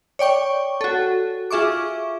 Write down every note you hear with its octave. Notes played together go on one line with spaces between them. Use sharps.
C#5 D5 G5 C#6
F#4 A4
F4 G#4 E5 C#6 D6